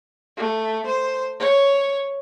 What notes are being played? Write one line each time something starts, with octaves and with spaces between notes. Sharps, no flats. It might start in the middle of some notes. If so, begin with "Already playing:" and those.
A3
C5
C#5